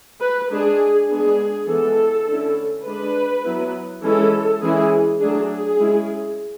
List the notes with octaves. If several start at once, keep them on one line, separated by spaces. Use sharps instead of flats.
B4
G#3 D4 G#4
G#3 B3 D4 G#4
E3 G#3 B3 A4
D3 A3 C#4 E4
G#3 D4 B4
F#3 B3 E4
E3 G#3 C#4 E4 A4
E3 G#3 C#4 E4 G#4
F#3 A3 D4 G#4
G#4
G#3 C#4 E4